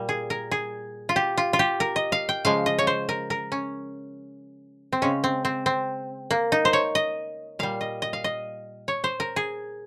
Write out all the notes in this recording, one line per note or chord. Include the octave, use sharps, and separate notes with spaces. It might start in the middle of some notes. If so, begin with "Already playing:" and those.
Already playing: A#2 G3
G#4
A#4
G#4
F4
G4
F4
F4
G4
A#4
D#5
F5
G5
C#3 F3 G#3 F5
D#5
C#5
C5
A#4
A#4
C#4
C4
C#3 G#3 C#4
C4
C4
C4
A#3
D#4
C5
C#5
D#5
A#2 G3 F5
D#5
D#5
F5
D#5
C#5
C5
A#4
G#4